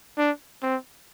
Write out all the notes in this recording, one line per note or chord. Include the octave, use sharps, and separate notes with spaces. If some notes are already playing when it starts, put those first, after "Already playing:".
D4
C4